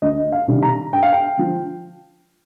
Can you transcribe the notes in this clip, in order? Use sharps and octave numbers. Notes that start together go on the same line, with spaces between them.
D2 D#5
F5
C3 D#3 G3 D4
A#5
G2 G5
F5
G5
D3 F3